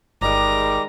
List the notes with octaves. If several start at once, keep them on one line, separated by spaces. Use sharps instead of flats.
G1 D#3 G3 G#3 A#5 D6